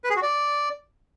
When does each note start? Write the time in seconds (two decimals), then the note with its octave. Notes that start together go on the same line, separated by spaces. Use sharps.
0.04 B4
0.10 G#4
0.16 F#4
0.22 D5